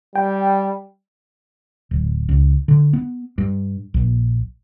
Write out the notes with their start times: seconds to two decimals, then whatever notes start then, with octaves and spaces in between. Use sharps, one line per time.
0.16 G3 G5
1.91 D1
2.29 C#2
2.68 D3
2.93 B3
3.38 G2
3.94 A#1